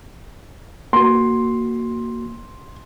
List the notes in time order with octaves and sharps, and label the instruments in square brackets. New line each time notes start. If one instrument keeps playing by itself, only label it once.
[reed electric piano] A#3 F#4 [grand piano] C6